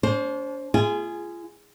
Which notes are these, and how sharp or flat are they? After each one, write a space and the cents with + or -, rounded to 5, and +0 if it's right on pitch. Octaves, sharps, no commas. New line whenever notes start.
D4 -40 C5 +15
F4 -30 G#4 +0 G#5 +0